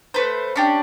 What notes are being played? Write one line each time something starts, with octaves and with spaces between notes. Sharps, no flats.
A3 B4 C5
C#4 D4 G4